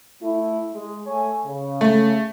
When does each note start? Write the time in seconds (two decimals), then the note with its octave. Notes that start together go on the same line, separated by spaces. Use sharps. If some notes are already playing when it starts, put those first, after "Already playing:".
0.22 A3 E4
0.74 G#3 G#4
1.06 A3 C#5 G#5
1.46 C#3
1.81 A3